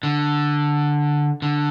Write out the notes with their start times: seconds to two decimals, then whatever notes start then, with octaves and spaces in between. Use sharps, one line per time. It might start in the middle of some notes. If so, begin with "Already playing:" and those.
0.03 D3
1.42 D3